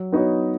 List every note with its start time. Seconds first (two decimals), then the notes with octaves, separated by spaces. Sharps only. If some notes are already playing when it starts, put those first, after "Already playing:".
Already playing: F#3
0.12 B3 D#4 F#4 C#5